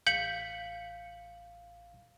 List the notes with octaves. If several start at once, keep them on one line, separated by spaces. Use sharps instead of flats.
A1 F5 G6 B6 C#7 F#7